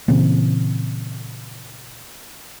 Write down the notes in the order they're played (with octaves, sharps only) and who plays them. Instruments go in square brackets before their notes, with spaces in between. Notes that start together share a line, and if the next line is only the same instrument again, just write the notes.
[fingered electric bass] A#2 C#3 E3 C4